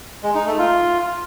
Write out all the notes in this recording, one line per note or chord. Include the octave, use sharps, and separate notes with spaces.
G#3
D#4
A3
F4